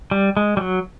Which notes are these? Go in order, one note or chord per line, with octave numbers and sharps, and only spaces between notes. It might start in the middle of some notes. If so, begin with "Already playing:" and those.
G3
G#3
G3
F#3